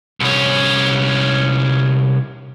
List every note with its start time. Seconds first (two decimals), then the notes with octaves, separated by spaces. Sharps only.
0.20 C2 C#4